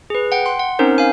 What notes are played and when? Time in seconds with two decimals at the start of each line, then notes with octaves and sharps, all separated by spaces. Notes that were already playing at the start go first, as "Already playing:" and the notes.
0.10 G#4 B4
0.32 F#5 G5
0.46 C6
0.59 F#5
0.79 C4 C#4 D#4 A#4 C5
0.98 F5 G#5